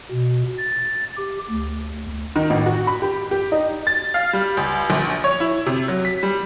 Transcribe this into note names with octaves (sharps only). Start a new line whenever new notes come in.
B2
A6
G4
D2
D#3
A1
F#4
B5
G4
G4
D#4
A6
F5
G3
C#2
A#1
C#5
E4
C3
F#3
B6
G3